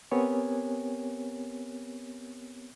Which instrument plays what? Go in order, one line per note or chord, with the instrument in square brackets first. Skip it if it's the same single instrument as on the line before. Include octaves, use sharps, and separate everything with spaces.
[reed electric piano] B3 C4 G4 A#4 C#5 G#5